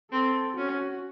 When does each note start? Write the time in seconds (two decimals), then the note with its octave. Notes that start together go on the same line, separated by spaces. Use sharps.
0.12 C4 A4
0.57 C#4 F#4